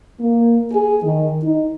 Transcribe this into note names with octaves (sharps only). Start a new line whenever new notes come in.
A#3
G#4
D#3
D#4